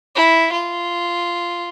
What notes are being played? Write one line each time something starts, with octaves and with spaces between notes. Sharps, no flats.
E4
F4